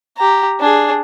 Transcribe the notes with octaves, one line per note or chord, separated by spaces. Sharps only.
G4 A#5
D4 G#4